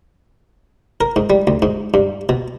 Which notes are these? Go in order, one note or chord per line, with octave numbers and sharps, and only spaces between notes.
A#4
G#2
G3
D2
G#2
G2
B2